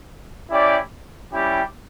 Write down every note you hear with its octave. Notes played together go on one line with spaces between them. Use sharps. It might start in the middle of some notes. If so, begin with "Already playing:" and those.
C#4 E4 G4 D5 G5
G3 C#4 E4 G4